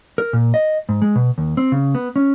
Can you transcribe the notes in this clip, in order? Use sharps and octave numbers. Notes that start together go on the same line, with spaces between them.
A#4
A#2
D#5
G#2
G#3
B2
D#2
C4
C#3
B3
C#4